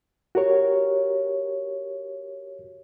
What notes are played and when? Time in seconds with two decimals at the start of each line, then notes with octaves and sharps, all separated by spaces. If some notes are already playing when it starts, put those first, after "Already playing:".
0.35 F#4 G4 A#4 C#5